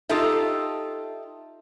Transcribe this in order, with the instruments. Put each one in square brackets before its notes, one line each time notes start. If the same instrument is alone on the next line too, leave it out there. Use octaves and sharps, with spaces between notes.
[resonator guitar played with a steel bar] D#4 F4 G4 A4 E5